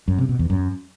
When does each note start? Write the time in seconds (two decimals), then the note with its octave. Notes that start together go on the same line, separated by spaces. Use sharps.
0.08 F#2
0.18 C3
0.29 B2
0.39 E2
0.50 F#2